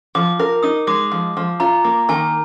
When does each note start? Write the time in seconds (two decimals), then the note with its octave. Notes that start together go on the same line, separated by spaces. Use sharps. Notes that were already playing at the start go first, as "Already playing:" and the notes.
0.15 F3 D6
0.40 A#4
0.63 D#4 D#6
0.87 G#3 D6
1.12 F3
1.37 F3
1.60 F4 A#5
1.84 A#3
2.09 D#3 G#5